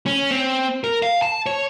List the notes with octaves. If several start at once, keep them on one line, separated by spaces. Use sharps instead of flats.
C#4
C4
A#4
F5
A5
C#5